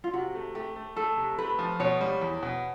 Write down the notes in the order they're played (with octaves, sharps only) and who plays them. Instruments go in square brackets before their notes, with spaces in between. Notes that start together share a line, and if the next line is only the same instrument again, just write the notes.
[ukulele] F4
[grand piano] C3 [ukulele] F#4
[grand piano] A3
[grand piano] A3 [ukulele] G4
[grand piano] A3
[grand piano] A3 [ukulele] A4
[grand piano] C3
[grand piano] A3 [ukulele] B4
[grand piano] F3
[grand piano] B2 [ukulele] C#5
[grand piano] G3
E2
B2